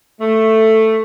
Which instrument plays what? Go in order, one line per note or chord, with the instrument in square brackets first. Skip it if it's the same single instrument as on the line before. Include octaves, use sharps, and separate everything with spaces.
[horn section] A3